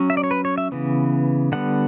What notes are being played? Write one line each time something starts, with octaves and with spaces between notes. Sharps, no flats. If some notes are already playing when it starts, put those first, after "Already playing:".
Already playing: F#3 C#4
E5
D5
C#5
B4
C#5
E5
C#3 E3 B3
D3 G3 B3 F#5